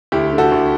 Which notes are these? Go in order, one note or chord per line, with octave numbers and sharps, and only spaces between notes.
D2 E4 G4
D3
F#4 A4
D2